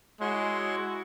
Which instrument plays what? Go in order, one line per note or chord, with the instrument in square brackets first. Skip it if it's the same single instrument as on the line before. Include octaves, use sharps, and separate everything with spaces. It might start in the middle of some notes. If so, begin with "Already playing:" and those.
[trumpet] G#3 [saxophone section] E4 F#4 [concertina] C#5 C6